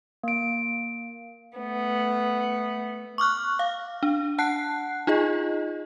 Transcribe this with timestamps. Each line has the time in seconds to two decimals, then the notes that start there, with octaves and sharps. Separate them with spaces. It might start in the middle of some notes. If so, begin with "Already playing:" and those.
0.23 A#3 D7
1.58 A3 B3
3.18 C#6 D6 F6 F#6
3.59 F5
4.03 D4
4.38 F#5 A5 F#6 C7
5.07 D#4 F4 G#4 D#5